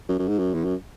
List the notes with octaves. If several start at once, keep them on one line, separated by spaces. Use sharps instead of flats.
F#2
F#2
G#2
F#2
E2
F#2